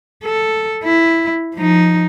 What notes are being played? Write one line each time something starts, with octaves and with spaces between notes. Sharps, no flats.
A4
E4
F3 D#4